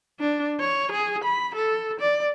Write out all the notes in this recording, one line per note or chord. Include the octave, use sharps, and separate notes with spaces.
D4
C#5
G#4
B5
A4
D5